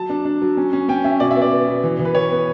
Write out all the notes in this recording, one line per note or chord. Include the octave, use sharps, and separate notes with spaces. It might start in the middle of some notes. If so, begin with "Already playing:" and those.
Already playing: F#3 A5
D4
D4
F#3
C#4
C#4
C#4 G5
C#4 E5
B2 D5
E5
B3
D5
B3
B2
E3
E3
B4
B3 C#5
B3